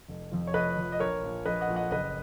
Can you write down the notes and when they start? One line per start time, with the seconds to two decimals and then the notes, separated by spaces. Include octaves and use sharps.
0.08 F1
0.32 F2 F3
0.47 C#5
0.54 F1 B4 D#5
0.77 F2 F3
0.92 D#5
1.00 A#1 A#4 C#5
1.23 A#2 F3
1.45 A#1 B4 D#5
1.61 D#5 F#5
1.68 A#2 F3
1.76 D#5 F#5
1.91 F#1 B4 D#5